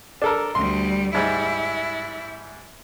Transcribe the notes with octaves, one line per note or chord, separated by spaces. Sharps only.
D4 A4 A#4
D2 G3 C6
G#2 G3 E4